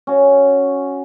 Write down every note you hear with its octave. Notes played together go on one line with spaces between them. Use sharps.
C#4 F#4